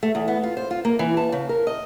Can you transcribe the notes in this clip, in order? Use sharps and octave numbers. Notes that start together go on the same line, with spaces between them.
A3
E2
B3
F4
C5
F4
A#3
E3
A5
C#3
A#4
D#5